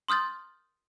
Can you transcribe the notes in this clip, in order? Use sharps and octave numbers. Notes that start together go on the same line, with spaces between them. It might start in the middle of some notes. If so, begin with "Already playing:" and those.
C6 D#6 F6 G6 A6